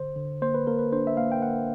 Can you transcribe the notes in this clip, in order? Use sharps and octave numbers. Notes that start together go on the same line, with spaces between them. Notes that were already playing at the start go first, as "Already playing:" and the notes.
Already playing: D3 C5
D3
A#3 C5
B4
A#3 A#4
B4
D4 C5
E5
A#3 F5
G5
A#3 F#5